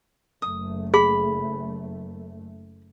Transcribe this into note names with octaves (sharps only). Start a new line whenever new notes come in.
F#1 A3 D#6
G#4 B5